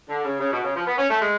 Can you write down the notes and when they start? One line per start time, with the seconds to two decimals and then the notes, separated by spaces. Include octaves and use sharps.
0.09 D3
0.25 C#3
0.40 C#3
0.51 B2
0.63 C#3
0.75 F3
0.86 B3
0.98 C#4
1.09 A3
1.21 G#3